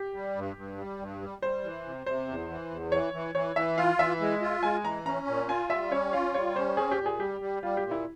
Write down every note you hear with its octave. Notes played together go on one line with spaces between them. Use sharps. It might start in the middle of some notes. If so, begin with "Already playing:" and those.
Already playing: G4
G3
G2
G2
G3
G2
G3
G3 C5
E3
C3
C3 C5
E2
E3
E2
E3 C#5
E3
E3 C#5
E3 E5
F4 F5
E3 E5
G#3
F4
G#3 G#5
E3 A#5
C#4 A#5
A#2
F4 G#5
G3 E5
C#4 C#5
F4 F5
G3 C#5
C#4 C5
C4 G#4
G4
A#2
G#4
G3 G4
G3
G3 F4
G4
A#2
E4